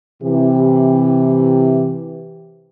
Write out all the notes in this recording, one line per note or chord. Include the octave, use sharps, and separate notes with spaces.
C3 E3 G4